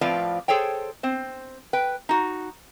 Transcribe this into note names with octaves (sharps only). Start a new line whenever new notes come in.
A2 F3 C4 F4 B4 D5
G#4 A4 C5 C#5 G5
C4 C5
B4 G5
D#4 F#4